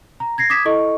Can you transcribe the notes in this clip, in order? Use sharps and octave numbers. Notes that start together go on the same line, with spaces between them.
A#5
G#6 A#6 C7
D6 D#6 G#6 B6 E7
E4 A4 D#5 C#6